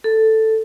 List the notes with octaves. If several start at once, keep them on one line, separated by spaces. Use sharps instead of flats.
A4